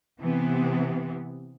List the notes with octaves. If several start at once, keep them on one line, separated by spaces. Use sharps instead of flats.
C3 E3 B3